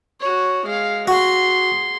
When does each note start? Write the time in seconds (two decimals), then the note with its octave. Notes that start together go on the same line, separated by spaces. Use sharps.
0.21 F#4 C#5
0.65 G#3 F5
1.07 F#4 G#4 C6